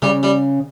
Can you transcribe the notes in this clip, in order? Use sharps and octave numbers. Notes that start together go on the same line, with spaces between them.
C#3 G3
G3